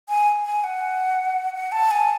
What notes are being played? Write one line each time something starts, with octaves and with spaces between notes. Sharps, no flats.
G#5
G#5
F#5
F#5
A5
G#5